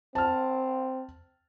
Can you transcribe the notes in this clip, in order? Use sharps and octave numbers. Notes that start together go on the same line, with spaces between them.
C4 A5 F6